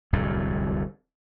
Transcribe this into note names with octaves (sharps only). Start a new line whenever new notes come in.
D1 C2 F2 A2